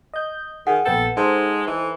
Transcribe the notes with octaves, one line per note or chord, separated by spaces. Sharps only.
D#5 G6
D#3 G#4 F#5
A#1 B3 A4 G5
G#3 D#4 A4 C5
E3